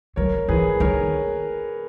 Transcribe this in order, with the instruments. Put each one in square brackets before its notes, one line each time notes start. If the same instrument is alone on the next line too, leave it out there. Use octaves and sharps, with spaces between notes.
[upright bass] F#3 [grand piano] A#4 C#5
[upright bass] E3 [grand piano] G#4 B4
[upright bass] D#3 [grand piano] A#4 C#5